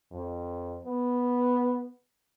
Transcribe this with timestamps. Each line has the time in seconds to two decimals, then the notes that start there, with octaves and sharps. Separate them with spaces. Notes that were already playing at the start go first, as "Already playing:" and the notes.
0.11 F2
0.85 B3